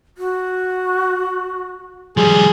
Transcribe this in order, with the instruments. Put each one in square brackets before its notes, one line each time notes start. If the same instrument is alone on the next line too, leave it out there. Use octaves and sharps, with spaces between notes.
[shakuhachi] F#4
[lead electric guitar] F3 G3 [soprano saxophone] G#4